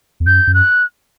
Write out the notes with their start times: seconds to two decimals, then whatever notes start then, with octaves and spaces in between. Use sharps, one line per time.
0.20 E2
0.26 F#2 G6
0.47 F#2
0.54 F#6